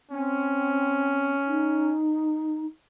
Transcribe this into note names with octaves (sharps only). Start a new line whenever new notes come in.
C4 C#4
D#4